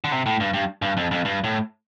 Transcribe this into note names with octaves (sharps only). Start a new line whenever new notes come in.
D3
C3
A2
G2
G2
G2
F2
F2
G2
A2